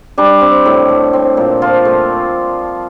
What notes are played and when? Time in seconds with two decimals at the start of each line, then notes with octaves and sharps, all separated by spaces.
0.18 G3 D4
0.41 C4
0.66 A2
0.89 A3
1.13 C4
1.37 A#2
1.62 F3 F4
1.85 A3